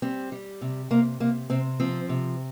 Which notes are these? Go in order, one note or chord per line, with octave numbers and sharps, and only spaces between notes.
G3 C4
G3
C3
C3 A#3
C3 A#3
C3 C4
F3 C4
C3